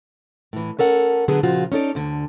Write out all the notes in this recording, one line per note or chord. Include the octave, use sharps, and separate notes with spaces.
A2 E3
C#4 A4 A#4 F#5
D3 F#3 B3 G#4
A#2 C#3 F3 F4 F#4
C#4 D#4 A4 D5
D2 D3